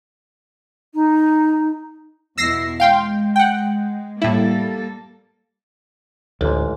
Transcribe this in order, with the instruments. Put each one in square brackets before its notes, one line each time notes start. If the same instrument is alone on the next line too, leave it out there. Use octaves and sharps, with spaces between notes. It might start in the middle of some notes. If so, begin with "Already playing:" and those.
[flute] D#4
[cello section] E2 B2 E4 [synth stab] E6 A#6 C7
[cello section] G#3 [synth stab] F5 G5 C6
[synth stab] F#5 G5
[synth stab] A2 E4 [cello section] G3 A#3 A4
[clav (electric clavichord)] A1 G#2 [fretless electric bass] D2